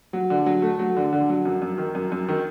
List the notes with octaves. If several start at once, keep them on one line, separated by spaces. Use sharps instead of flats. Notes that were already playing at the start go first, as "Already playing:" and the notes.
F#3
D3
F#3
A3
F#3
D3
D3
F#3
F#2
F#2
D#3
F#2
F#2
D#3